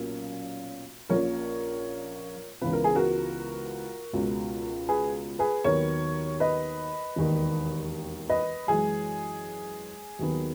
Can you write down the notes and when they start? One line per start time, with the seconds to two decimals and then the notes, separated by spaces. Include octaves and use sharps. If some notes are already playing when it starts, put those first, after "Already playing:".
Already playing: B1 A#2 A#3 C#4
1.09 A#1 A#2 A#3 C#4 A#4 C#5
2.61 C#2 C#3 E3 B3 B4
2.73 A#4
2.84 G#4
2.95 F#4 A#4
4.13 C#2 B2 G#3 C#4
4.89 G#4 B4
5.39 G#4 B4
5.64 D#2 D#3 F#3 B3 A#4 C#5
6.40 B4 D#5
7.16 E1 D#2 D#3
8.29 B4 D#5
8.67 F#2 E3 G#3 G#4
10.19 D#2 D#3 F#3 B3